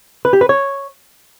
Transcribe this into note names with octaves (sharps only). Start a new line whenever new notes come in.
B4
G4
B4
C#5